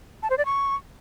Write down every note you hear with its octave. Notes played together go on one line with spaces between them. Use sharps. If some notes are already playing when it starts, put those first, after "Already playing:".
A5
C5
D5
C#6